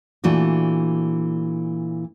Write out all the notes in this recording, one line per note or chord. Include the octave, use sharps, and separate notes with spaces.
A#2 E3 A3 D4 F#4